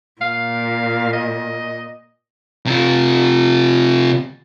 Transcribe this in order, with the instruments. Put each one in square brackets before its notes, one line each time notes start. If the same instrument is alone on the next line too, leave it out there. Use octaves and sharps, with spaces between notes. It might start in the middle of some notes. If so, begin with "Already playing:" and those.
[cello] A#2 [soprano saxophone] F5
[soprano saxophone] D#5
[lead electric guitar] C3 F4